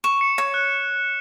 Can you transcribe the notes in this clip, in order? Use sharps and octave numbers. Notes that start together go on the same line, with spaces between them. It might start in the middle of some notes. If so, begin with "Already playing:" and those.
C#6 E7
C#7
C#5
F#6